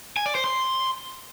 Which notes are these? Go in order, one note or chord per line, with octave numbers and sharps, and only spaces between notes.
G#5
D5
C5
C6